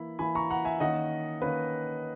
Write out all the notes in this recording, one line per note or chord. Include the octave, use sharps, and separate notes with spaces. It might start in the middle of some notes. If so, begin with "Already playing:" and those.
Already playing: E3 A#3 E4 B5
E3 A#3 E4 G#5 B5
A#5 C#6
F#5 A#5
E5 G#5
D#3 A#3 C#4 D#5 F#5
D#3 A#3 C#4 B4